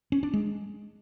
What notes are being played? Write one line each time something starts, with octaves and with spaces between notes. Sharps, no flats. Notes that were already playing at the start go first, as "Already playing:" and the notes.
C#4
D4
G#3